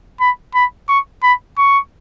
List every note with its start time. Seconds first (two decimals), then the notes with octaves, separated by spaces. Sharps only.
0.20 B5
0.55 B5
0.89 C#6
1.23 B5
1.58 C#6